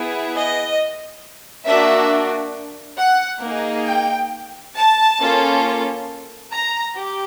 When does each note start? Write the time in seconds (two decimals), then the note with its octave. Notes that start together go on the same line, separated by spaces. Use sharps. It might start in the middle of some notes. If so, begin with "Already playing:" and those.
Already playing: B3 E4 G#4
0.34 D#5
1.66 A#3 D4 F#4 E5
2.98 F#5
3.43 A#3 D#4 G#4
3.87 G5
4.76 A5
5.20 A#3 C#4 F4 A4
6.53 A#5
6.96 G4